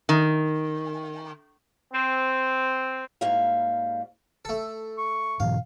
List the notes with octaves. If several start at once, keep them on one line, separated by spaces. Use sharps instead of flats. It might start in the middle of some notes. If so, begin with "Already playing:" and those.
D#3
C4
G#2 G3 A#3 F#4 E5 F5
A3 A4
C#6
G#2 B2 E3 F5